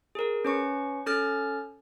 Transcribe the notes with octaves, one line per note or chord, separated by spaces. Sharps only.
G#4 A#4
C#4 B4 C#6
C#4 A4 F6 A6